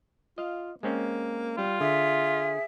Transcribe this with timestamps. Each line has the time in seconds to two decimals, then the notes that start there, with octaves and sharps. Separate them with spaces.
0.38 F4 D#5 F5
0.83 G#3 A#3 C4 C#4
1.58 G3 F4
1.80 D3 G#4 E5